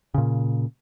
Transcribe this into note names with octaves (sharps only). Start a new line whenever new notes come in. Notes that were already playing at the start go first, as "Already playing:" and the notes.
A#2 C#3